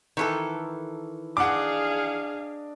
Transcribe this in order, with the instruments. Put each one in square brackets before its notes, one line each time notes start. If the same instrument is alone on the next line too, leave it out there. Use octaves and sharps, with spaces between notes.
[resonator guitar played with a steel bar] D#3 E3 A4
[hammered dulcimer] D4 D5 D#5 [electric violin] G#4 F5 [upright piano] F#5 D6